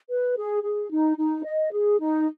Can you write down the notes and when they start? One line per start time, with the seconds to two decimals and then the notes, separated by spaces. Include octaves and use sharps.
0.09 B4
0.37 G#4
0.64 G#4
0.91 D#4
1.18 D#4
1.44 D#5
1.72 G#4
1.99 D#4